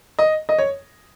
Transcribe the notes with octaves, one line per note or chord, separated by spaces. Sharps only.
D#5
D#5
C#5